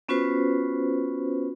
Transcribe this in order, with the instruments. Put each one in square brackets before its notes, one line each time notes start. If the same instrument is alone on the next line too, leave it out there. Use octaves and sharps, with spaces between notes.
[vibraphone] B3 C#4 F4 F#4 B4 C5